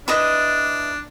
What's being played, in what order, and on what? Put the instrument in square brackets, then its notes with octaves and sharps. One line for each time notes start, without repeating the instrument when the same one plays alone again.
[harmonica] D4 [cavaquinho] E4 B4 D#5